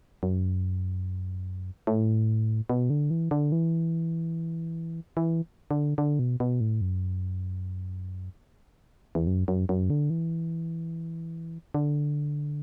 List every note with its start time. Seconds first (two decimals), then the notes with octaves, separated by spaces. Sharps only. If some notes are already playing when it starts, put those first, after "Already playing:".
0.23 F#2
1.87 A2
2.70 B2
2.90 D3
3.10 E3
3.31 D3
3.52 E3
5.17 E3
5.71 D3
5.98 D3
6.19 B2
6.40 B2
6.61 A2
6.81 F#2
9.15 E2
9.27 F#2
9.48 F#2
9.69 F#2
9.90 D3
10.10 E3
11.74 D3